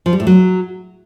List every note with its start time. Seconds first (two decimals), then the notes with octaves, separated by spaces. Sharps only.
0.06 F3
0.13 G3
0.20 A2
0.27 F#3